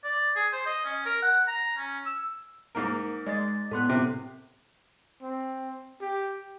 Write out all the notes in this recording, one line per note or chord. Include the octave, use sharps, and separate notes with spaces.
D5
G#4
C5
D#5
C#4
A#4
F#5
A#5
C#4
E6
G#2 A#3 A#4
G#3 D5 D#5 A6
A2 B3 A4 C6 F#6
C3
C4
G4